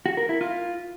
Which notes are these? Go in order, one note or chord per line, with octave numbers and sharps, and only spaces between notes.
F#4
A#4
E4
F4